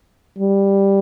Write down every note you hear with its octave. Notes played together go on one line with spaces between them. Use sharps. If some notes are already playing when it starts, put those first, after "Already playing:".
G3